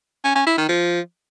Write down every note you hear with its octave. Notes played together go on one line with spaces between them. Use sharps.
C#4
C#4
E4
D#3
F3